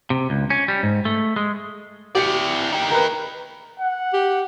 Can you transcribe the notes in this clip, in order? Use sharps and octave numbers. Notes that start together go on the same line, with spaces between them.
C3
C#2
C#4
G3
G#2
A3
G#3
E4 G4 D5 G5 C#7
D#4 G4
A#4 B4
F#5
G4